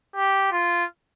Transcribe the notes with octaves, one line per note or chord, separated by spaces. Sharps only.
G4
F4